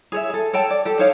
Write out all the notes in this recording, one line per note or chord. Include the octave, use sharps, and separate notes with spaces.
G#4 C#5 E5
G#4 A4
A4 C#5 G5 A5
D5
G4 A4
D#4 C5 C#5 F5